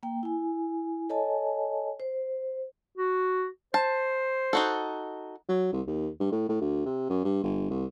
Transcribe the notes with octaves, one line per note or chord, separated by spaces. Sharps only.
A#3 G5
E4 G#5
A4 C#5 D#5 G#5 A5
C5
F#4
C5 A5
D#4 F#4 A4
F#3
C2
D#2
G2
A2
A2
D2
C3
F#2
G2
G1
C2